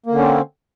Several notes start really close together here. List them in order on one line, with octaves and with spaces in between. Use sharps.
A#3 D3 C#4 C4